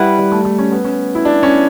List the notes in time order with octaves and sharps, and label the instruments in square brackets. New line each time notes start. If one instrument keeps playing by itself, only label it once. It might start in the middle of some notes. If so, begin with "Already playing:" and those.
Already playing: [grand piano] G3 [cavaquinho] E4 B4 F#5
[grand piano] G3
A3
A3
C#4
B3
C#4
E4
D4
C#4